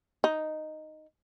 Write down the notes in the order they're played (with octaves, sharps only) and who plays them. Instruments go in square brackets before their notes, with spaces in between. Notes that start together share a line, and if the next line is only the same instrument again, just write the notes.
[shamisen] D#4